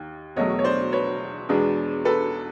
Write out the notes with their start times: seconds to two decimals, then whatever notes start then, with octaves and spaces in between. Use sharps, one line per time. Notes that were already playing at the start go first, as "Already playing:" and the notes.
Already playing: D#2 D#3
0.36 E1 E2 B2 F#3 A3 C#5 D#5
0.59 C#5
0.64 C5 D5
0.92 B4 C#5
1.49 E2 B2 G#3 B3 D4
2.05 A4 B4